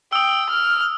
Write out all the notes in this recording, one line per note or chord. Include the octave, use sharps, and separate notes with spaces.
G5 D#6 E6
F6